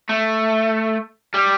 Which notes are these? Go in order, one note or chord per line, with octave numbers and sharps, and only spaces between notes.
A3
G3